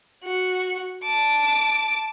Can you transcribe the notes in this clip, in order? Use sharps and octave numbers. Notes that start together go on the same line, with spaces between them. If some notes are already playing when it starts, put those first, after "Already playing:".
F#4
A5 D6